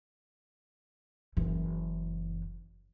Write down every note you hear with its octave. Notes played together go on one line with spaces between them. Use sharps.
F#1 E3